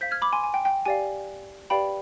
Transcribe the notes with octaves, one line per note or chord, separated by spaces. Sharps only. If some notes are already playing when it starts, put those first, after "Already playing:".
C5 F5 G6 B6
F6 G#6
B5 D6
G#5 C6
G#5
G5
G5
G4 D5 F5 G#5
G4 B4 D5 F5 G5 B5